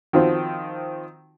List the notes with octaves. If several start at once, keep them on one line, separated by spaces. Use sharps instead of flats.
D#3 F3 C4 F#4